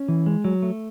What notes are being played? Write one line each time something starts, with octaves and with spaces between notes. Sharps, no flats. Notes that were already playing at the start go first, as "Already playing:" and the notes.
Already playing: C#4
E3
G#3
F#3
A3